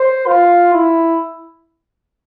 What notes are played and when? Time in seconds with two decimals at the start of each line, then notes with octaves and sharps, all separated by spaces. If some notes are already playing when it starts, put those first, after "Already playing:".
Already playing: C5
0.27 F4
0.74 E4